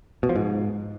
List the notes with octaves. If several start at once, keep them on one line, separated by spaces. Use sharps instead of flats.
B2
F3
G#2